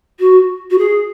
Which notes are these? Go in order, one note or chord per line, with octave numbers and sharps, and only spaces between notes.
F#4
F#4
G#4